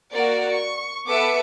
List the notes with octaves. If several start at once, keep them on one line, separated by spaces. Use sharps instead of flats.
A#3 F#4 A#4 D5 F#5
C#6
B3 A4 B4 E5 D6 C#7